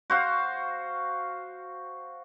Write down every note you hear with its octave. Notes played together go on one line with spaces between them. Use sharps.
F#4 C5 F5